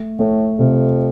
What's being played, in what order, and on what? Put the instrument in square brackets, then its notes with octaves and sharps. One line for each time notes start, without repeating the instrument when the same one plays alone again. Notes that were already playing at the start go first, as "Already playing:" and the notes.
Already playing: [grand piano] A3
[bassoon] A2 [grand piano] A3
[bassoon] F2 [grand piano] C3